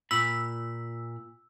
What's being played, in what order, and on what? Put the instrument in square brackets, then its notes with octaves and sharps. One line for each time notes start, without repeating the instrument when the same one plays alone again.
[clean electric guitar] A#2 B5 [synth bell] E6